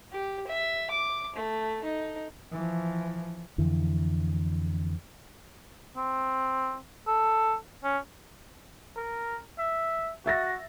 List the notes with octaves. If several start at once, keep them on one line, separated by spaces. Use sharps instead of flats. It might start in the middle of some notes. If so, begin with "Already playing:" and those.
G4
E5
D6
A3
D#4
E3 F3
F2 D3 E3
C4
A4
C#4
A#4
E5
F#4 E5 A6 A#6